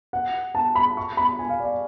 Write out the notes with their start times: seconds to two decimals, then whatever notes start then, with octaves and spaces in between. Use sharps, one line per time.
0.13 F#5
0.55 A5
0.75 B5
0.97 C#6
1.17 B5
1.39 G#5
1.49 F5
1.60 D5